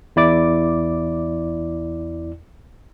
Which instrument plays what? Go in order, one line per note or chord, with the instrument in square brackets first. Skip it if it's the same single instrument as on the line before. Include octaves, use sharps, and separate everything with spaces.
[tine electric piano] E2 E4 D5 D6